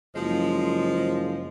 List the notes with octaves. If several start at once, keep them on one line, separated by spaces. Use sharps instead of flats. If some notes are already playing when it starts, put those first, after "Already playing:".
F#1 F3 G#3